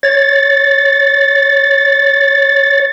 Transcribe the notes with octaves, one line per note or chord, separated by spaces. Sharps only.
C#5 A6